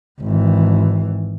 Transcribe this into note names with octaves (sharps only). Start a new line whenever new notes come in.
G#1 E3